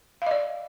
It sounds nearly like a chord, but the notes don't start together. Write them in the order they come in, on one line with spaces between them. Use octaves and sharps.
F5 D#5 D5